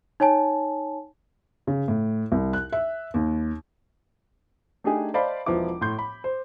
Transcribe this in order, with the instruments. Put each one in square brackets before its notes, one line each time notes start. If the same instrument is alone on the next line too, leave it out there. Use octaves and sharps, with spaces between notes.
[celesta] D#4 C#5 G#5 A5
[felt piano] C#3
A2
C2
F#6
E5
D#2
[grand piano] A3 D4 D#4 G4 G#4 G#5
C5 D5 D#5 F5 A5 B5
E1 F3 B3 E4 D6
A2 C6 G6
B5
C5